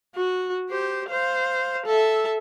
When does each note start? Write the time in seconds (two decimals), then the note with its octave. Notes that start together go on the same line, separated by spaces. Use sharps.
0.15 F#4
0.69 G4 C5
1.09 C5 F5
1.86 A4 E5